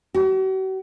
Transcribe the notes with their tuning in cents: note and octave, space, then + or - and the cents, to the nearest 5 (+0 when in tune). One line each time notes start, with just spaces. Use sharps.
F#4 +45